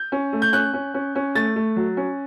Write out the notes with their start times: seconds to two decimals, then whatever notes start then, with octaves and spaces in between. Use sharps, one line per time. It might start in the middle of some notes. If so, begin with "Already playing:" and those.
Already playing: G6
0.12 C#4
0.33 A3
0.42 G6
0.53 C#4 F#6
0.73 C#4
0.94 C#4
1.15 C#4
1.35 A3 A6
1.56 A3
1.76 F#3
1.97 C#4